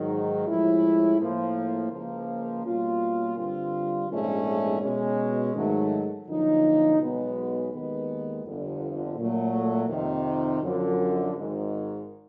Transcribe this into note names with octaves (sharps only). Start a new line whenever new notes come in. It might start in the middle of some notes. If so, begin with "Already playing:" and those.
Already playing: G#2 D#3 F#3
A2 F3 G#3 C#4 E4
A2 F3 A#3
C#2 C#3 F3 A#3
B2 G3 A#3 C#4 F4
G2 D3 G3 C4 F4
A#1 G#2 E3 A3 C#4
B2 G#3 C#4
G#2 D#3 F#3 A3
F#2 D3 F3 A#3 D#4
B1 B2 G#3 B3
D#2 D#3 G#3 B3
G1 F2 D3
A#2 F#3 A3
F2 C3 D#3
F#2 D3 F3
G#1 G#2 D#3